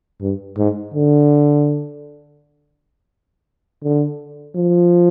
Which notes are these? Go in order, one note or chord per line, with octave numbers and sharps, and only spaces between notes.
G2
G#2
D3
D3
F3